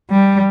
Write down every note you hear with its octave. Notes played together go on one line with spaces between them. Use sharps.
G3